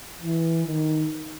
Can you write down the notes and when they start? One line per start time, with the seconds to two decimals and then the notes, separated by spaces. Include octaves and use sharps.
0.22 E3
0.67 D#3